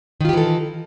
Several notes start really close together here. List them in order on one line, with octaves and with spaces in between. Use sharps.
D#3 F4 G4 E3 A4